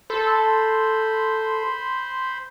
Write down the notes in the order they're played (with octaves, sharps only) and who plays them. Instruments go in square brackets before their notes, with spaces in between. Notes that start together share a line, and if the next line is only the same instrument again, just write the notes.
[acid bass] A4 [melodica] C5 B5 C6